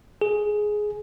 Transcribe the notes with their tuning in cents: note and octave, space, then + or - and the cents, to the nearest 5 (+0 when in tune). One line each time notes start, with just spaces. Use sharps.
G#4 +10